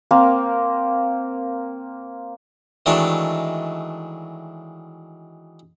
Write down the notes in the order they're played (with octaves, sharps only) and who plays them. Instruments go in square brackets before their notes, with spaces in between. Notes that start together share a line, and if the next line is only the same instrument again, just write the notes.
[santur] A#3 C4 A#4
[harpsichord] D#3 E3 F#3 G#3 A3 D4